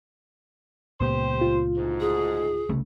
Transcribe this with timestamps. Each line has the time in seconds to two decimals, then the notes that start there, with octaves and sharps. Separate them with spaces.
1.01 C#2 A#2 B3 G4 C5
1.41 F4
1.77 D2 G#2
2.00 G#4
2.69 C2 C#3 A3